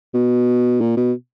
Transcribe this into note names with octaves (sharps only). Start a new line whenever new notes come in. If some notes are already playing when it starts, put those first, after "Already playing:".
B2
A#2
B2